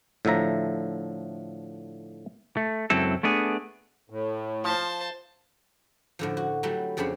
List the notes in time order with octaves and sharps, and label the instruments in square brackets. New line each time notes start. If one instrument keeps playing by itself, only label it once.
[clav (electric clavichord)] A2 D3 F3 E5 A#5
[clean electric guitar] A3
C#2 F#2 F#3 C4 E4 A4
A3 B3 D4 G#4
[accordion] A2
[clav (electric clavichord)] F3 [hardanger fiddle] C5 A5
[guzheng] A2 D3 F3
F#4
F#3 G3 A3 E4
F2 C#3 D4 C5 C#5 B5